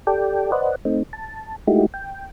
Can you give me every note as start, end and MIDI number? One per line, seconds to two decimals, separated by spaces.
0.07 0.51 67
0.07 0.51 69
0.07 0.51 74
0.07 0.51 79
0.52 0.75 71
0.52 0.75 72
0.52 0.75 74
0.52 0.75 75
0.52 0.75 78
0.85 1.03 57
0.85 1.03 60
0.85 1.03 63
1.13 1.56 81
1.67 1.86 56
1.67 1.86 57
1.67 1.86 63
1.67 1.86 64
1.67 1.86 66
1.67 1.86 67
1.94 2.30 79